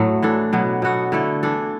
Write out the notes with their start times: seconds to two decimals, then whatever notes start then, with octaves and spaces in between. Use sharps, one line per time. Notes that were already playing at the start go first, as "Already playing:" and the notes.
Already playing: A2 F#3 A3
0.22 E3 D4 A4
0.53 B2 F#3 B3
0.82 B2 B3 F#4 A4
1.12 D3 A3 E4 A4
1.43 E3 D4 A4